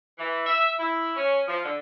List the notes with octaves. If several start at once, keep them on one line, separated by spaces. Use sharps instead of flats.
E3
E5
E4
C#4
F3
D3